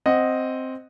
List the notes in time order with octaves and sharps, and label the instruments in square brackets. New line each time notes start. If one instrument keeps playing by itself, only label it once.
[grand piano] C4 D#5 F#5